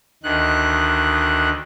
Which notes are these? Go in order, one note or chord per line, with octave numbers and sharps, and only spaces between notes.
D2 D#3 F#6